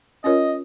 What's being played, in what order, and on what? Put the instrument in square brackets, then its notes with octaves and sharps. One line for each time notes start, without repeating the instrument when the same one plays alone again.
[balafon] C#4 F4 A#4 C#5 [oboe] D#5